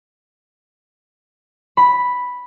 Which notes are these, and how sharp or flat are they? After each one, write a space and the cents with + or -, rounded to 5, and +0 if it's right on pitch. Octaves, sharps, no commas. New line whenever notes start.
B5 +0